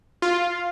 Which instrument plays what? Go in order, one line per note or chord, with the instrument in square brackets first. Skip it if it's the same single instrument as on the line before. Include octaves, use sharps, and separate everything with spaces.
[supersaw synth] F4